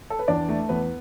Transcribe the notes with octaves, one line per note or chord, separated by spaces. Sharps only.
A4
B4
E2 D4 D5
A3
E2 B3 B4